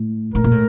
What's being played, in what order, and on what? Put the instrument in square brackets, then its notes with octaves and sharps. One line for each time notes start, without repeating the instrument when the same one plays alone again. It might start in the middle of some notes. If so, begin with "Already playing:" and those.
Already playing: [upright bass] A2
[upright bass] A2 [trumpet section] A#4
[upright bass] A#2
A2